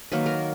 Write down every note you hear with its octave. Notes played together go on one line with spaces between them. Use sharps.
D#3 F#3 A#3 B4
A#4